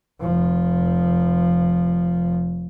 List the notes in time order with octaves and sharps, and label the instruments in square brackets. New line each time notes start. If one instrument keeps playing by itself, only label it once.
[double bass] F1 F3